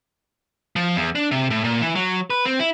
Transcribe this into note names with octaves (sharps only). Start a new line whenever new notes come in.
F3
E2
D4
C3
A2
A#2
E3
F#3
B4
C4
E4